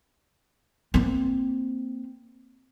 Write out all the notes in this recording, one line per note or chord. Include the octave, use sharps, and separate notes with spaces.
A#3 C4